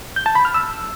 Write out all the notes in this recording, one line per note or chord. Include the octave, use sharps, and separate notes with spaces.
G6
A5
B5
F6
E6